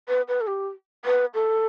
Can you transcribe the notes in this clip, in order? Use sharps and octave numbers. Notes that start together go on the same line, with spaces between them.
B4
B4
A4
G4
B4
A4